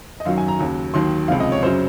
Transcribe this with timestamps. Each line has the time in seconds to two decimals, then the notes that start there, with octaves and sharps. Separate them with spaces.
0.20 D#5
0.25 F#2 D#3 F#3 F5
0.38 G#5
0.48 A#5
0.59 D#2 C#3 F#3
0.94 D#2 D#3 F#3 C6
1.28 C#2 C3 F3 F5
1.40 D#5
1.52 C#5
1.62 F#2 C#3 F#3 C5